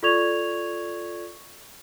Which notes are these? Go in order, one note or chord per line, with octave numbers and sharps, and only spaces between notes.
F4 A4 D5 C#6 G#6 F7